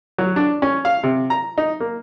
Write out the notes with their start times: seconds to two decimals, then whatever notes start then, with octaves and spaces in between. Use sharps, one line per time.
0.18 F#3
0.36 D4
0.62 C#4
0.85 F5
1.03 C3
1.30 A#5
1.58 D#4
1.80 A#3